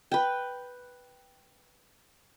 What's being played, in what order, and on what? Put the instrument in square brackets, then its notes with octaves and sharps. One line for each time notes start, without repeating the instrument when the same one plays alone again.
[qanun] B4 G5